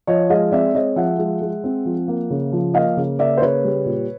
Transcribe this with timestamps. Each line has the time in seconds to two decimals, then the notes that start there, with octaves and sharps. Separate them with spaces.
0.07 F3 C#5 D#5
0.30 G#3 D#5 F5
0.52 C4 D5 E5
0.74 G#3 C#5 D#5
0.96 F3 E5 F#5
1.19 G#3
1.41 G#3
1.64 C4
1.85 F3
2.08 A#3
2.30 C#3
2.52 F3
2.74 A#3 D#5 F5
2.97 C#3
3.19 A#3 D5 E5
3.37 C5
3.42 C#3 B4 C#5
3.64 G3
3.85 A#2